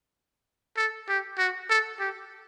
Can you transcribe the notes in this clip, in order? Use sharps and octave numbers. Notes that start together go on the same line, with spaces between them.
A4
G4
F#4
A4
G4